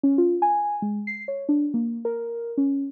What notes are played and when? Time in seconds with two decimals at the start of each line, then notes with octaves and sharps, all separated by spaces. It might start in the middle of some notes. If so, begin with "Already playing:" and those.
0.03 C#4
0.18 F4
0.42 G#5
0.82 G#3
1.07 C7
1.28 C#5
1.49 D4
1.74 A#3
2.05 A#4
2.58 C#4